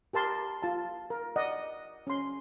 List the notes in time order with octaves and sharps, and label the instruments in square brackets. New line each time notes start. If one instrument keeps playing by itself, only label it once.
[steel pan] G4 A#4 A5 C6
F4 A5
A#4
D5 D#5 F#5
C#4 C6